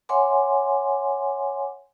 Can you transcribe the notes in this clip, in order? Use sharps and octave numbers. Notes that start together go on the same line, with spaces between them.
C#5 E5 F#5 G#5 C6 D6